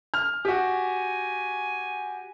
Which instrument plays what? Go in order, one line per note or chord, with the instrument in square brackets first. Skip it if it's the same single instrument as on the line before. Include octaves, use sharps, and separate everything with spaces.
[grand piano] F6
[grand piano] F#4 G4 [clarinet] G#5